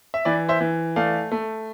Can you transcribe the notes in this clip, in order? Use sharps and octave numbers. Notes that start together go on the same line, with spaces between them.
E5
E3 B4 D5
C5 E5
E3
A3 D5 F5
A3